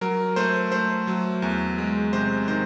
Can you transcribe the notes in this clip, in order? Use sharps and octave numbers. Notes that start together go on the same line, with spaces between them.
F#3 A#4
A3 C5
A3 C5
F#3
E2
G#3
C3 C5
D#3 C5